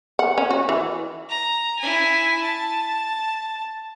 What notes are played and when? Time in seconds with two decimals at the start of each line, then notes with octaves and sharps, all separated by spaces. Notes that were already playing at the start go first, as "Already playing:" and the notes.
0.19 F#5
0.38 C#4
0.51 F#4
0.69 E3
1.29 A#5
1.79 E4 G#5
2.42 A5